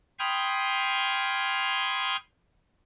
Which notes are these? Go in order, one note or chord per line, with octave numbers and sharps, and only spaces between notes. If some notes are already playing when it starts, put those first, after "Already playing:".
G5 B5 C6 D#6 F6 G#6